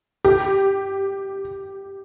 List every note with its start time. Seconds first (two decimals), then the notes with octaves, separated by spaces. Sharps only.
0.25 G4